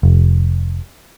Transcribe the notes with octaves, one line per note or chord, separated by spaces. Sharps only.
F1